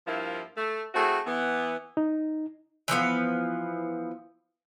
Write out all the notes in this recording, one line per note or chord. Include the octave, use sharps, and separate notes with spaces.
G2 F3 A#3 E4
A3
A3 C4 E4 F#4 G#4
E3 B3
D#4
E3 F3 B3 F5